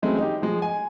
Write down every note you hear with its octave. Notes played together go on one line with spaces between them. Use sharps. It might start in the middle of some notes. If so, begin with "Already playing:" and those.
E3 F#3 G#3 A3 C4 C#4
D#4 G4
F3 G#3
G#5